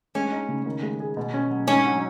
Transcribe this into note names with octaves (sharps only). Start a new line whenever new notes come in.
G#3 C#4
D#4
C#3
D#3
G#3
G#4
B2
C#4
F#3
G#2 C#4
F#3